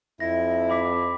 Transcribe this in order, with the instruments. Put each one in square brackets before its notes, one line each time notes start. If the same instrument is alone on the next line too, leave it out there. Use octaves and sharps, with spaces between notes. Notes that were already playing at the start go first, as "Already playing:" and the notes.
[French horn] F2 [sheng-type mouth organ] E4 [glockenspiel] A#6
[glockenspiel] B5 D6 B6